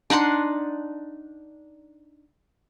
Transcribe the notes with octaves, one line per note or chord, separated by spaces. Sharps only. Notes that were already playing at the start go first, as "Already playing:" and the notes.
D4 D#4 F#5 C6